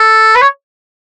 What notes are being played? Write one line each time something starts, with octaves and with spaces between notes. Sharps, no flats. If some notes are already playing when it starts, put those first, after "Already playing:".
Already playing: A4
B4
C#5